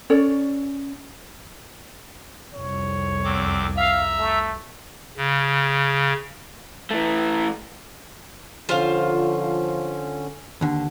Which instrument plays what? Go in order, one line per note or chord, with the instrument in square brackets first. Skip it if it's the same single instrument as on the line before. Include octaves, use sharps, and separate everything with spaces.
[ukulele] C#4 A4 C#5 D5
[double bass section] C2 F2 [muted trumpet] C#5
[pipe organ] E2 C4 D6
[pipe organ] E5 A#5 E6 [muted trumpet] F5
[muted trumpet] A3
[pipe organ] C#3
[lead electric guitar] E3 A3
[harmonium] D3 C#4 [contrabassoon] F3 [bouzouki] F4 C5 F5
[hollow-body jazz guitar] D#2 D3